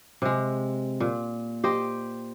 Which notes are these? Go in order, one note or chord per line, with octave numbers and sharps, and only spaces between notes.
C3 G#3
A#2
G4 C5 D#5